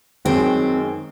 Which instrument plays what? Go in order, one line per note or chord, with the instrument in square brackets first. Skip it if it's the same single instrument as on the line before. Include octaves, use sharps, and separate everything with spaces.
[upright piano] F#2 D#3 G#3 [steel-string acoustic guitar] C4